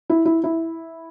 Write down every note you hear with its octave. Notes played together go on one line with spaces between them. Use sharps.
E4
E4
E4